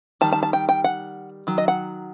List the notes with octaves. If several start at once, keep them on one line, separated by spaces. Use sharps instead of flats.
D#3 G3 A5
A5
A5
G5
G5
F#5
D#3 F#3
D#5
F#5